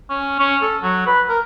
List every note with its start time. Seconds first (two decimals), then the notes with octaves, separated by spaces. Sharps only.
0.09 C#4
0.39 C#4
0.62 A4
0.83 F#3
1.07 B4
1.29 A#4